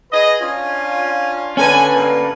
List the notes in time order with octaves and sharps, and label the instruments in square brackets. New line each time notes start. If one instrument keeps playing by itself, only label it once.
[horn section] G#4 B4 D#5
C#4 D4 F4
[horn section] D3 G#5 [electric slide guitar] C#4 A4 B4
[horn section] G2 D3 A#3